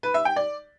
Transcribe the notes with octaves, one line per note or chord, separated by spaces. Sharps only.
B4
E5
G5
D5